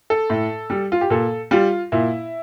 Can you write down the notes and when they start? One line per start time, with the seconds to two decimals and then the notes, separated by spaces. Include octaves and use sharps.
0.10 A4
0.30 A2
0.70 G3
0.92 F4
1.01 G4
1.10 A#2 A4
1.51 G3 F4
1.92 A#2 E4